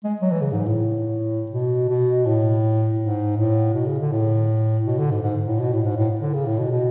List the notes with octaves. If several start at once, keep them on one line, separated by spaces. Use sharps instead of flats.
G#3
F#3
E3
C#3
G#2
A2
B2
B2
A2
G#2
A2
B2
C#3
D3
A2
B2
D3
G#2
G#2
A2
B2
A2
G#2
A2
D3
C#3
A2
B2
B2